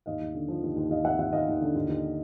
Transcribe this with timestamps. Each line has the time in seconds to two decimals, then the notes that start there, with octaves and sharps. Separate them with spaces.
0.06 D#2 D#5 F5
0.21 D#2
0.35 D3
0.48 F3
0.63 D#2
0.76 D#2
0.90 D#2 D#5 F5
1.04 D#2 E5 F#5
1.18 D#2 E5 F#5
1.33 D#2 D#5 F5
1.48 D#2
1.61 D3
1.75 D#2
1.89 D#2